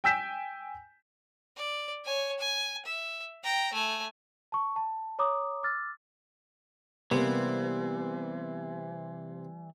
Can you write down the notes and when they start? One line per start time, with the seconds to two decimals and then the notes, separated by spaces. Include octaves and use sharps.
0.04 G5 G#5 E6 G6 B6 E7
1.56 D5
2.05 C#5 G#5
2.39 G#5
2.86 E5
3.43 G5 A#5
3.73 A3 G#5
4.52 A5 C#6
4.76 A5
5.19 C#5 A#5 D6 D#6
5.63 D6 E6 F6 A6
7.11 C3 E3 G3 A#3 B3